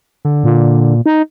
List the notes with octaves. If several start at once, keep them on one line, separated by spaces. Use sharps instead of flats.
D3
A#2
D#4